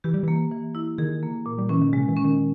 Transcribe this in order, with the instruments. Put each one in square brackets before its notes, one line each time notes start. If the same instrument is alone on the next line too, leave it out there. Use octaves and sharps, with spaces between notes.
[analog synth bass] E3 [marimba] G4
[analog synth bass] G3
[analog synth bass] E3 [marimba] A#3
[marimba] E3
E4
[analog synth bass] D#3 [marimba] G#4
[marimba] A#3
A#2
[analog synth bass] G3
[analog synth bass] E3 [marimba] C#4
[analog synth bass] D#3
[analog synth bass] C#3 [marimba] G#3
[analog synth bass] E3
[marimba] C#4
[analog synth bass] D#3